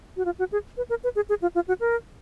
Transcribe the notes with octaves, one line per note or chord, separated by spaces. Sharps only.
F#4
F4
F#4
G#4
B4
A#4
B4
G#4
G#4
F4
F4
F#4
A#4